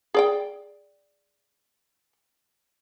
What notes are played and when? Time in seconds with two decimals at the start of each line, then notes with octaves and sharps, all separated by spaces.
0.14 G#4 D5 G5